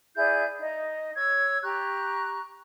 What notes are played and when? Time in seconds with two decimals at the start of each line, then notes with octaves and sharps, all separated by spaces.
0.16 E4 G#4 D5 G6
0.59 D#4 D#5
1.15 C#5 E6 G#6
1.62 G4 A#5 C#6 F#6